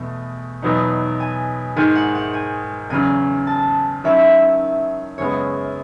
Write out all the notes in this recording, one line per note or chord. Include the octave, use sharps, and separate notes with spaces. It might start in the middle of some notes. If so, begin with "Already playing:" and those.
Already playing: E2 B2 A3
E2 B2 F#3 B3 D#4
G#5
G#2 D#3 G#3 G#5
F#5
F#5
G#5
E2 C#3 F#3 C#4 G#5
A5
D#3 F#3 C#4 E4 E5
F#2 C#3 G#3 B3 C#5